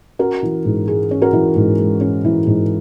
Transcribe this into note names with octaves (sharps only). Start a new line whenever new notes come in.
C#4 F#4 A#4
E3
G#2
G#3 G#4
C#4
F#4 A#4
E3
G#2
G#3
C#4
E3
G#2